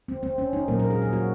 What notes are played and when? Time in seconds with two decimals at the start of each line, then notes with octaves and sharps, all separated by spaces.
0.08 C4
0.23 C4
0.38 C#4
0.53 D#4
0.68 A#2 F#3 A#3 A#4
0.79 A#4
0.90 G#4
1.02 G#4
1.13 F#4